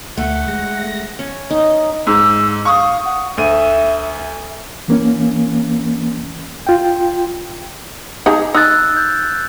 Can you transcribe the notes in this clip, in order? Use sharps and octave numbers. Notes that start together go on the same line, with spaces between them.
D2 A3 F#5
G#3 A#6
C#4
D#4
G#2 E6
F5 C#6 D#6
F#5
D2 E5 D#7
E3 A#3 C#4
F4 G5
D#4 G#4 A#5
D#4 E6 F#6 A6
G6